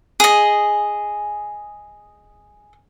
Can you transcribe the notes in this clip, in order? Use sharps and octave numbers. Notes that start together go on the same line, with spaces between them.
G#4 D#5